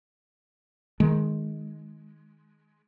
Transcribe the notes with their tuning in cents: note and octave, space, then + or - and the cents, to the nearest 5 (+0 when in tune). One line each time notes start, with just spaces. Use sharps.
D#3 +0 G#3 +15